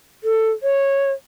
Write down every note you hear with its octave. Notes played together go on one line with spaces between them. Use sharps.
A4
C#5